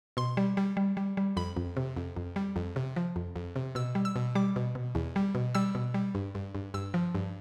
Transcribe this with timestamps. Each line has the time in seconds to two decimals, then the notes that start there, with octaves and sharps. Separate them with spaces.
0.17 B2 C6
0.37 G3
0.57 G3
0.77 G3
0.97 G3
1.17 G3
1.37 F2 B5
1.57 F2
1.77 C3
1.97 F2
2.17 F2
2.36 G3
2.56 F2
2.76 C3
2.96 F3
3.16 F2
3.36 F2
3.56 C3
3.75 B2 E6
3.95 G3
4.05 E6
4.16 B2
4.35 G3 D6
4.56 B2
4.75 B2
4.95 E2
5.16 G3
5.35 B2
5.55 G3 E6
5.75 B2
5.94 G3
6.15 G2
6.35 G2
6.55 G2
6.74 G2 E6
6.94 F3
7.15 G2